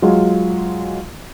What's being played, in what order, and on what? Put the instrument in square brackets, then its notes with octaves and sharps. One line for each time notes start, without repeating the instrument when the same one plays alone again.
[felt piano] F#3 G#3 F4